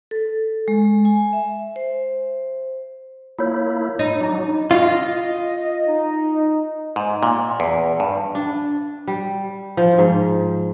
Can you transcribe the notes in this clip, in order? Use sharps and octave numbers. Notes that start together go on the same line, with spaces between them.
A4
G#3
G#5
E5
C5
A#3 E4 F4 C#5
D#4 C#5 B5
F#3 D4 D#5 A#5
F4 D#5
D#4
G#2
A#2
E2
G2
D4
G3
F3
G#2